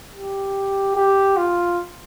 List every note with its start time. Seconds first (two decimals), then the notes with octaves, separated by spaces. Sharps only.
0.14 G4
0.95 G4
1.37 F4